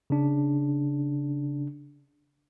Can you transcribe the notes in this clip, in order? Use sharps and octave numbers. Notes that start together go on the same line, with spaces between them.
C#3 D4